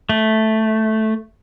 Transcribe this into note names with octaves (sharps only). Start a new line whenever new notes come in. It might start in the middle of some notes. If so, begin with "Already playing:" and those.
A3